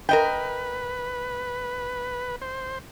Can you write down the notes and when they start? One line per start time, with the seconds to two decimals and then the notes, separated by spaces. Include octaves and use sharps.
0.09 A#4 B4 D#5 G5
2.41 C5